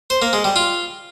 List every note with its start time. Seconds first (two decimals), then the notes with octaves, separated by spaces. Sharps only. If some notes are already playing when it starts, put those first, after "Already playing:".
0.10 C5
0.22 A#3
0.33 G#3
0.44 G3
0.56 F4